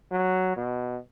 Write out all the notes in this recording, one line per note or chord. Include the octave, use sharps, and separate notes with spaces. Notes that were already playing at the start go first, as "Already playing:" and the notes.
F#3
B2